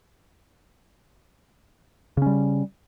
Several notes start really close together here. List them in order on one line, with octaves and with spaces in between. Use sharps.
C#3 C#4 G3